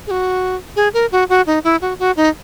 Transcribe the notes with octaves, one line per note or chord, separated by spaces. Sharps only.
G#4
F#4
G#4
A#4
F#4
F#4
D#4
E4
F#4
F#4
D#4